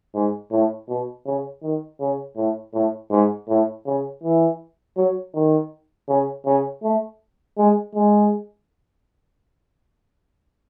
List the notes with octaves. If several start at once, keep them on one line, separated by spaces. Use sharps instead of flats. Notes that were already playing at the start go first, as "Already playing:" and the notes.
G#2
A2
B2
C#3
D#3
C#3
A2
A2
G#2
A2
C#3
E3
F#3
D#3
C#3
C#3
A3
G#3
G#3